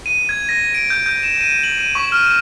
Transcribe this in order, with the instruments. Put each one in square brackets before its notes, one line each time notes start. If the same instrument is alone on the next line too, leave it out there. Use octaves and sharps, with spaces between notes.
[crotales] D#7
G#6
A#6
D7
G6
G6
E7
D#7
F#7
D#7
C#6
F6